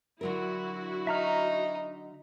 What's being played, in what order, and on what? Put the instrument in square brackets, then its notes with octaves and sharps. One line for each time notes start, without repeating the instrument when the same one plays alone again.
[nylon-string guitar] D3 F#3 A#4 [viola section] E4 F#4
[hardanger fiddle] D#4 [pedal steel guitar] E5 A#5 F6